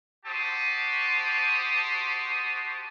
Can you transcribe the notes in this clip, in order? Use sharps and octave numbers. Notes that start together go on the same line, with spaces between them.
F#4 G4 C5 A5 D#6